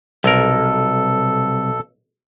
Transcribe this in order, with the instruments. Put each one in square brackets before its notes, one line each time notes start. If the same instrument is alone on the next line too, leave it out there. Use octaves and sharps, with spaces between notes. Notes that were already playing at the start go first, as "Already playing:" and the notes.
[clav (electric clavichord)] B1 A#4 [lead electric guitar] C3 G3 [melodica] A4